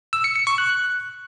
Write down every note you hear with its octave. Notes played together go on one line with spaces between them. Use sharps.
E6
C#7
C#7
C#6
F#6